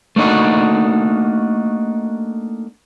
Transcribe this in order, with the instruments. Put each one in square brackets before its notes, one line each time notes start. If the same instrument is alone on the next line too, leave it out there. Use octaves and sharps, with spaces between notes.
[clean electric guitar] A3 A#3 D4 D#4 F#4